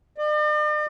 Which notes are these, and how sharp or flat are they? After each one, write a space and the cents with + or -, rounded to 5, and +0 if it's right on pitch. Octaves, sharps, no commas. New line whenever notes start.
D5 +45